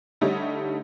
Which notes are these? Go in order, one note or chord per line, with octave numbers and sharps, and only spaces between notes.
D3 G3 A3 D#4 G4 C#5